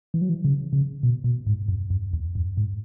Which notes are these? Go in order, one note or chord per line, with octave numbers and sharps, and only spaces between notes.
E3
F#3
E3
C#3
C#3
B2
B2
G#2
F#2
F#2
E2
F#2
G#2